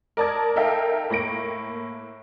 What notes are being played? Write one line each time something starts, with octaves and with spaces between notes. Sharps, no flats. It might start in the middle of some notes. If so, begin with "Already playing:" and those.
A#4 D5 A5 D#6 G#6
D#4 A4 A#4 E5 F5 G5
A2 A#3 A#6 D7